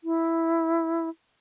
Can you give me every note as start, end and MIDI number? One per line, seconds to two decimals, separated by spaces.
0.04 1.09 64